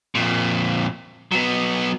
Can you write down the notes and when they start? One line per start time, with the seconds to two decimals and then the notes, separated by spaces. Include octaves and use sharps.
0.15 F2 A#2
1.32 F#3 B3